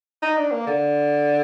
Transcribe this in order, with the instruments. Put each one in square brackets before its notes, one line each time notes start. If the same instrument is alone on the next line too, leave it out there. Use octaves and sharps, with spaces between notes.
[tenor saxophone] D#4
D4
A#3
D3